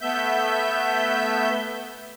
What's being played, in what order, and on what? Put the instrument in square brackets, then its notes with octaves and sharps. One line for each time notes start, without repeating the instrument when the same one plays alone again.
[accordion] A3 B3 E5 G6